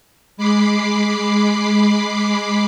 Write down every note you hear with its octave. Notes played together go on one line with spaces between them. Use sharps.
G#3 B5 D6 C7